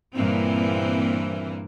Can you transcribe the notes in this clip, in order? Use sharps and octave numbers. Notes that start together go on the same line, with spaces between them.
G2 A#2 E3 A#3 C4